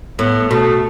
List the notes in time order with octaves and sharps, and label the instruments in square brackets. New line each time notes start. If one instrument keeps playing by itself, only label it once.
[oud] A2 [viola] B3
[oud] B2 [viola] A3